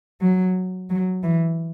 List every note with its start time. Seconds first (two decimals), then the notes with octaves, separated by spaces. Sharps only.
0.21 F#3
0.90 F#3
1.23 E3